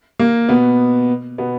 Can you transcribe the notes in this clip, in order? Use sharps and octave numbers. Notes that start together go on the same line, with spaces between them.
A#3
B2 B3
B2 B3